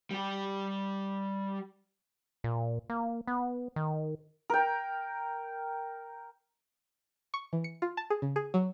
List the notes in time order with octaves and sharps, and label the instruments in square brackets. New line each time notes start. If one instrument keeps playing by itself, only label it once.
[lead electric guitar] G3 G4
[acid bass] A#2
A#3
B3
D#3
[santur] A#4 G5
[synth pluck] C#6
E3
C#7
F4
A5
G#4
C#3
G#4
F#3